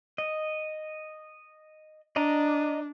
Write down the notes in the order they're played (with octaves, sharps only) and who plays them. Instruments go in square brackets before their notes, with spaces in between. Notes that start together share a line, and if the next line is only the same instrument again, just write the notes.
[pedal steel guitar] D#5
[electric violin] D4 [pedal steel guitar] D5 D#5 A#5